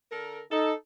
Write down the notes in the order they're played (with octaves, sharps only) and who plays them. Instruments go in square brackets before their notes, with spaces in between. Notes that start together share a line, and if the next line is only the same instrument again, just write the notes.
[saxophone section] D3 A4 A#4
[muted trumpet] D#4 [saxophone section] A4